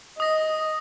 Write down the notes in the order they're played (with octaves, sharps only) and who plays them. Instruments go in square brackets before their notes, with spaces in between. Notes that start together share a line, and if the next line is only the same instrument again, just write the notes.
[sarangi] D#5 [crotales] D#6 A#6